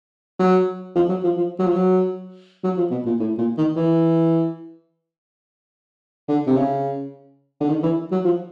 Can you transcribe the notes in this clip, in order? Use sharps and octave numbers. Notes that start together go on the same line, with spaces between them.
F#3
F3
F#3
F3
F3
F#3
F3
F#3
F#3
F3
B2
A#2
A2
A#2
D#3
E3
D3
C3
C#3
D3
D#3
E3
F#3
F3